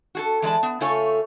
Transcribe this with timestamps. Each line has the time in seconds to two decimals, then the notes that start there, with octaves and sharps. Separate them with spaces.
0.15 F#4 G#4 A4
0.42 E3 G#3 D5 A5
0.63 B3
0.81 C#3 A3 F4 A4 C#5 G#5